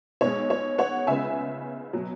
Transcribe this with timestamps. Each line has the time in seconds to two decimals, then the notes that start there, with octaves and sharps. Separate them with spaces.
0.21 B1 B2 G#3 C#5
0.50 C#5
0.78 C#5 F#5
1.07 C#2 C#3 G#3 B3 E5 G#5
1.93 B2 F#3